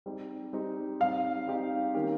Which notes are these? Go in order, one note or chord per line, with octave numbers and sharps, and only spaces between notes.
G3 C4 D#4 G4
G3 C4 D#4 G4
G3 C4 D#4 G4 F5
G3 C4 D#4 G4
D#3 A#3 C#4 G4